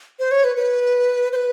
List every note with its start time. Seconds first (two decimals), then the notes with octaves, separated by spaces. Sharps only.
0.19 C5
0.31 C#5
0.44 B4
0.56 B4
1.32 C5
1.36 B4